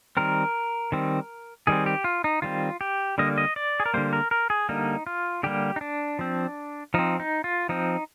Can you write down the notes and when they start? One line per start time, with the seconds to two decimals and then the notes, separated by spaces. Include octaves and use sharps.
0.17 D#3 G3 C4 A#4
0.92 D#3 G3 C4
1.67 D#3 G3 C4 G#4
1.86 G4
2.04 F4
2.24 D#4
2.42 D#3 G3 C4 F4
2.81 G4
3.18 D3 G3 A#3 D#5
3.38 D#5
3.56 D5
3.80 G#4
3.86 A#4
3.94 D3 G3 A#3 C5
4.13 A#4
4.31 A#4
4.50 G#4
4.69 D3 G3 A#3 D#4
5.07 F4
5.43 D3 G3 A#3 G4
5.76 D#4
5.81 D4
6.19 F3 C4
6.94 F3 C4 D#4
7.20 D#4
7.44 F4
7.69 F3 C4 D#4